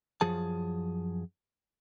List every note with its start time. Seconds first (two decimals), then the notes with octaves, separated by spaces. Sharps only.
0.21 F#2 F3 G#4 A5